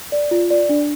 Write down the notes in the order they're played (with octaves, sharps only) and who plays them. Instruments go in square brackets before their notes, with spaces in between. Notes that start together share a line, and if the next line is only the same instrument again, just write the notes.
[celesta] D5
F4
D5
D4